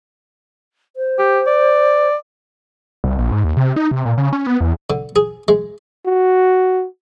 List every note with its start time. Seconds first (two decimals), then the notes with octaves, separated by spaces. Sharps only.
0.96 C5
1.18 G4
1.46 D5
3.04 C2
3.19 A#1
3.32 G#2
3.44 D#2
3.57 C3
3.76 D#4
3.91 C3
4.05 A#2
4.18 C#3
4.33 C#4
4.47 B3
4.61 E2
4.90 D3
5.16 G#4
5.48 G#3
6.06 F#4